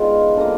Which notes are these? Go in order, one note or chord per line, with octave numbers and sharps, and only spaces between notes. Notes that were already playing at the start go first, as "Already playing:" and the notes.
Already playing: D#3 G#3 B3 D4 F4
D3 F#3 A#3